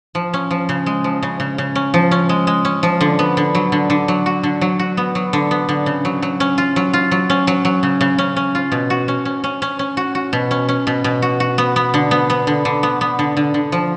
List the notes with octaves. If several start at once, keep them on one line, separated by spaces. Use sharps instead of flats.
F3
C#4
F3
C#3
G#3
F3
C#3
C#3
C#3
C#4
F3
C#4
G#3
G#3
C#4
F3
D3
B3
D3
F#3
D3
D3
F#3
F#4
D3
F#3
F#4
B3
F#3
D3
B3
D3
C#3
F#3
F#3
C#4
F4
F#3
F4
F#3
C#4
F#3
F#3
C#3
C#3
C#4
C#4
F4
B2
F#4
C#4
C#4
C#4
C#4
C#4
F#4
F#4
B2
C#4
C#4
B2
B2
F#4
F#4
B3
B3
D3
B3
B3
D3
D3
B3
B3
D3
D3
D3
F3